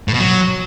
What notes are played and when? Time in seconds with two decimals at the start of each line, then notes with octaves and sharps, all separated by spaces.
0.08 A2
0.14 B2
0.20 F#3